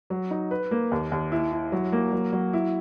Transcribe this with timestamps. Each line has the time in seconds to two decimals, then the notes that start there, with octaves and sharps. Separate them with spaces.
0.10 F#3
0.31 D#4
0.51 B4
0.71 A#3
0.91 D#2
1.12 D#2
1.32 E4
1.52 E4
1.72 F#3
1.92 A#3
2.13 F#3
2.33 F#3
2.53 E4